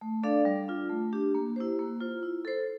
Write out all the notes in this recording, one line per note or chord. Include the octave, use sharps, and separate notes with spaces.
A3
D4 A4 D5 F5
G3
D4 F4
A3
D4 G4
A#3
E4 G4 C5
A#3
F4 C5
E4
A4 C5